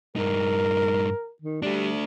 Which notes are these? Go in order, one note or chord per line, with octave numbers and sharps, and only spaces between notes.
G2 D#4 A#4
D#3
G3 A3 D4